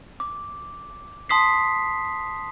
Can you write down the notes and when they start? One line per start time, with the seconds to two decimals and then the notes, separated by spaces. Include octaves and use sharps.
0.20 D6
1.29 A5 C6 D#6 B6 C7